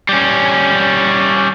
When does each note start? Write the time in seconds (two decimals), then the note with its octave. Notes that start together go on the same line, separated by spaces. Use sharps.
0.09 G3 C#4